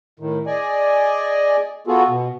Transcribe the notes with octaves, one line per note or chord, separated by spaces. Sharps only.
A2 D#3
G#4 D5 D#5 G#5
B3 F4 F#4 G#4 A4
B2